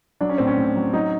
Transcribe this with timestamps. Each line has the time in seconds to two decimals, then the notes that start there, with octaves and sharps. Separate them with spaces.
0.21 F#3 D4
0.29 C#4
0.38 A2 C4
0.47 C#4
0.58 A2
0.76 F#3
0.93 F#3 D#4